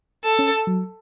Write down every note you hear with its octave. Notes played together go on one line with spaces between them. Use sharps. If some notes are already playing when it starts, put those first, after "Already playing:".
A4
C#4
F#3